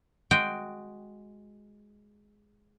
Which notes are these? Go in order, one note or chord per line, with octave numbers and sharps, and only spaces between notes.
G#3 F#4 G5